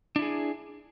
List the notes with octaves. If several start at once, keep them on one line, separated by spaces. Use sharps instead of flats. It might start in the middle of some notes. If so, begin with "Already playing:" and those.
D4 E4 G#4